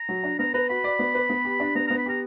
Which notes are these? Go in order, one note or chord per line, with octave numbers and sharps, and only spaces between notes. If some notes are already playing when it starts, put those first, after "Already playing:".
Already playing: A#5
F#3
D4
B3 A#5
B4 A#5
F#4 B5
D5
B3
B4
B3
G4
D4
B3 A#5
B3 A#5
B5
G4 A#5